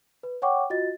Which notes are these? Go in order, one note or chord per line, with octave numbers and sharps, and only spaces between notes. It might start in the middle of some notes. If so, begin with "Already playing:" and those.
B4
C#5 F#5 G5 C#6 D6
F4 F#4 D#5 A6